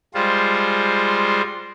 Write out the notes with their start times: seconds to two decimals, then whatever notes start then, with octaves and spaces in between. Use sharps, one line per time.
0.14 G3 G#3 F4 C5